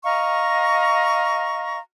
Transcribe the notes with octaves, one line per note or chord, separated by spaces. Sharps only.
D#5 F5 A#5 C#6